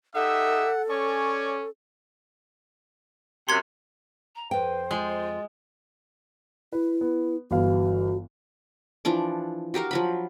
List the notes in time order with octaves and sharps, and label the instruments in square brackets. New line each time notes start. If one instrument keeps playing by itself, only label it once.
[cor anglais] D#4 [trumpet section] G4 E5 [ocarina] A4 [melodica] F#5
[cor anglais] C#4 [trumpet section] C#5 D5 G#5 [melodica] C#6
[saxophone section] F#2 C3 [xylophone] C6 G#6
[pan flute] A#5
[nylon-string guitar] F2 G5 [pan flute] B4 [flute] C5
[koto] G#3 [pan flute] F4
[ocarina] E4 [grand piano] B4
[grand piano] B3
[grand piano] G1 E3 F5 [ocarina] F#4
[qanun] E3 F3 D4 D6
F#4 G4 A#4 F5
F3 F#3 B5